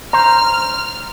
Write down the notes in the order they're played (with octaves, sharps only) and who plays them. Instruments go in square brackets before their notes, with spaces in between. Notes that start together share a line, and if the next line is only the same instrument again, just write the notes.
[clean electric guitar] C5 [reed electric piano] A#5 [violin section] F6